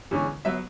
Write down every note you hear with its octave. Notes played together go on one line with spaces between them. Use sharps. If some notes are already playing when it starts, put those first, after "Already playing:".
E2 D3 G#3 C#4
F#3 B3 E5